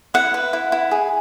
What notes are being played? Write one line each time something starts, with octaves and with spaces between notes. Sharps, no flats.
E4 F#5
B4
E4
E4
G#4